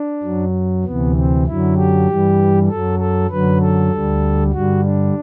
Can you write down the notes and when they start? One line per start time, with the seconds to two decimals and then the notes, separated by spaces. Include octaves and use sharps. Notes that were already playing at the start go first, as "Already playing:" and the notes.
Already playing: D4
0.23 F#2 F#3
0.84 D2 C3 E3 B3
1.16 C4
1.46 F#2 D3 F#3 E4
1.76 G4
2.07 G2 E3 G3
2.69 F#2 F#3 A4
2.99 A4
3.30 F#2 D3 F#3 B4
3.61 A4
3.91 D2 D3 G3
4.52 G2 D3 G3 F#4
4.83 D4